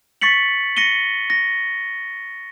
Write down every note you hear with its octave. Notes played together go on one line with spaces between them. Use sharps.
C#6 A6 B6 C#7 F#7
A#6 C#7 D#7 G7
A#6